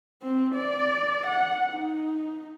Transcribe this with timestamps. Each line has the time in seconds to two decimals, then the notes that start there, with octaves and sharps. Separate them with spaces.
0.22 C4
0.55 D5
1.27 F#5
1.73 D#4